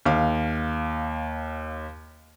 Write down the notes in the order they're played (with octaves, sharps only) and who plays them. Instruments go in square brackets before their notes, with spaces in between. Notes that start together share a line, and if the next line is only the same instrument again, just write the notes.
[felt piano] D#2 F5